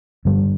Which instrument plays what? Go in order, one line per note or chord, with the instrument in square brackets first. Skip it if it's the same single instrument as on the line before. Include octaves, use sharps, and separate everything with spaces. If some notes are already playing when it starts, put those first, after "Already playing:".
[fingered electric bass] G2 D3 G3